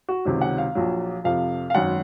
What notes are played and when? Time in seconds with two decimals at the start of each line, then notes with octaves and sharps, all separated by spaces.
0.09 F#4
0.25 C#2 C3 D#3 F#3
0.41 F#5
0.58 F5
0.75 A#1 A#2 F#3
1.24 F2 C3 F3 F5
1.70 F5
1.74 G#1 F#2 D#3 F#5